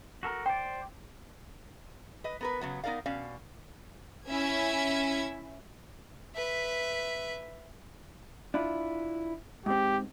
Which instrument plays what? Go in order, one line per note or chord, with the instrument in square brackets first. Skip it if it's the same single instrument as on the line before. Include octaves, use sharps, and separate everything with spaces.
[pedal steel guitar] F#4 A4 A#4
[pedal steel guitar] C5 D5 [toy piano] G5
[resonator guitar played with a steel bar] B4 D#5
B3 A#4 B4
C#3 F#3 B3
B3 D#4 A#4 D5 F5
B2 C#4 D5 F5
[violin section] C#4 E4 E5 G#6
[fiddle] B4 E5
[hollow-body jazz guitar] D4 E4 F4
[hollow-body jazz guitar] G#2 C4 [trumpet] G4